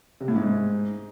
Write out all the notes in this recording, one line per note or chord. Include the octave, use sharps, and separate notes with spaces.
C3
A2
G#2